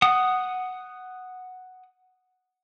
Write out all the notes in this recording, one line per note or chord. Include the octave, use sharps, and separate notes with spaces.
F#5 D#6